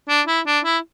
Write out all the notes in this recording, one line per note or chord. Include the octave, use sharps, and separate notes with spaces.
D4
E4
D4
E4